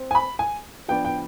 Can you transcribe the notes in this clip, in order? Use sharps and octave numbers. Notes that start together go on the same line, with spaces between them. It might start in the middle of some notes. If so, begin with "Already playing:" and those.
Already playing: C4
G#5
B5
G#5
F3 B3 D4 G5
G5